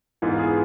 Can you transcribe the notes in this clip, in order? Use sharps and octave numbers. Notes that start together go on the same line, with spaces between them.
G#2 E3 B3 F4
G#4